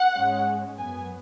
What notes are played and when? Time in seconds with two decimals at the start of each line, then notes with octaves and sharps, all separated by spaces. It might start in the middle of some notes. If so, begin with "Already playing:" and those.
Already playing: F#5
0.16 G#2 G#3 C#4
0.77 F#2 F#3 B3 G#5